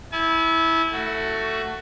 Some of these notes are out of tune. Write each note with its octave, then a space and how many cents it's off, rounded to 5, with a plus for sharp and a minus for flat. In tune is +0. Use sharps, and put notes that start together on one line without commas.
E4 -15 G#5 +45
A3 +15 F#4 +15